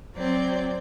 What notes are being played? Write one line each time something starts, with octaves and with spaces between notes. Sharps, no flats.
F#3 C4 D5